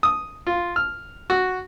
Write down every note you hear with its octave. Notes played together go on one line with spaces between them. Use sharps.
D#6
F4
F6
F#4